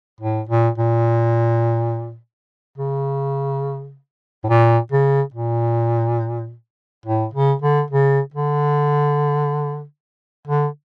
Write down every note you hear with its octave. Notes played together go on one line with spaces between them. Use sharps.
A2
A#2
A#2
C#3
A2
A#2
C#3
A#2
A2
C#3
D3
C#3
D3
D3